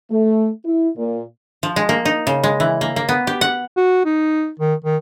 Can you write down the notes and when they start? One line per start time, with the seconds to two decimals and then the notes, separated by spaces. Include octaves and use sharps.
0.10 A3
0.65 E4
0.97 A#2
1.63 F3
1.76 G#3
1.89 A#3
2.05 D#4
2.27 C#3
2.44 G#3
2.60 E3
2.81 A#3
2.96 A#3
3.09 B3
3.27 G4
3.41 F#5
3.77 F#4
4.05 D#4
4.60 D#3
4.84 D#3